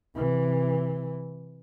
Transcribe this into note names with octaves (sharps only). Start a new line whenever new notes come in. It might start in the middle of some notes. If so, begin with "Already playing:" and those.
C3 E3